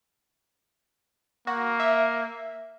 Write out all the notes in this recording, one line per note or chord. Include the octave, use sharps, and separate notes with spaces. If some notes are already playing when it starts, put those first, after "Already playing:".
A#3 F#4
E5